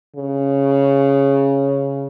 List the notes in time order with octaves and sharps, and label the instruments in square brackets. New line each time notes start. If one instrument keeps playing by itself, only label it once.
[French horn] C#3